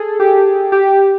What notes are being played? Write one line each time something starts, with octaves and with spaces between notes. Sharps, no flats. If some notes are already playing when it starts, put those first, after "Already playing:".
Already playing: G#4 A4
G4
G4
G4